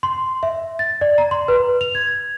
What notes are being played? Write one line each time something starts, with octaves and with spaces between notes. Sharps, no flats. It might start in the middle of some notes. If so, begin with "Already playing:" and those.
C6
E5
A6
D5
A#5
C6
B4
F7
G#6